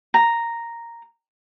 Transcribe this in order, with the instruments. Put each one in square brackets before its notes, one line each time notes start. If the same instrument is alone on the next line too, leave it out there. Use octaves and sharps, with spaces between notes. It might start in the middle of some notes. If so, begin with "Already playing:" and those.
[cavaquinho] A#5